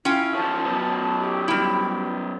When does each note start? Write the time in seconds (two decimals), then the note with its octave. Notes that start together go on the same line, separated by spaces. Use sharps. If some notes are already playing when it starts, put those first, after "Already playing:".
0.05 C#4 E4 F4 G5
0.35 C#3 F3 A5
0.65 F#2 B3
1.20 G4
1.48 G3 E4